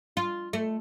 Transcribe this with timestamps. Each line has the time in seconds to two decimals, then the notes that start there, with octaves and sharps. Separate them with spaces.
0.17 F4
0.53 A3